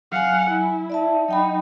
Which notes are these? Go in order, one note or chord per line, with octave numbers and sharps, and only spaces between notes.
F#3 F5 F#5 G#5
E4
D5 E5 A5
F#3 D#4 G5 B5